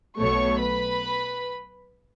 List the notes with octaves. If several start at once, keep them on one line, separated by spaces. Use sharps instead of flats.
B1 B2 A3 C#5 C#6
B4 B5